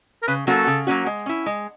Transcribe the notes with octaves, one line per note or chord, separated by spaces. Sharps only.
A#4
C#3 B4
F#3 A#3 C#4 F#4 A4
C#3
F#3 A#3 C#4 F#4
G#3
C#4 E4
G#3